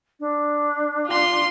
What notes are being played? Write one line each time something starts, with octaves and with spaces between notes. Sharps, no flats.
D4
F4 C6